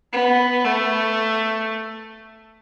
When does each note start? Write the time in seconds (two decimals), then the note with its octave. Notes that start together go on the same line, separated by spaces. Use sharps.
0.12 B3
0.64 A3